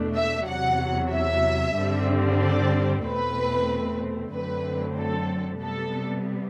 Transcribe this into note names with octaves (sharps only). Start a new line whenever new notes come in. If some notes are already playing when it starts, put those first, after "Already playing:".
Already playing: E2 B2 A3 D4
E5
E2 C3 F#3 F#5
E5
G2 D3 G3 C4
D5
E2 B2 A3 C4 B4
F#2 D3 F#3 A3 C4 B4
A4
C3 G3 B3 A4